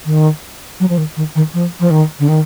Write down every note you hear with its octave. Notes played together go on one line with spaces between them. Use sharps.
D#3
F#3
F3
D#3
D#3
D#3
F3
F3
D#3
D3
D#3